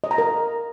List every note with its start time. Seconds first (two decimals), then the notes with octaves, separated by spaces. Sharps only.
0.04 D#5
0.11 A#5
0.18 A#4